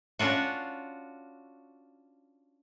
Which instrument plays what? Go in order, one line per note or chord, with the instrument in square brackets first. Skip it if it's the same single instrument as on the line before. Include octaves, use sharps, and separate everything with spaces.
[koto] C#4 D4 F4 F#4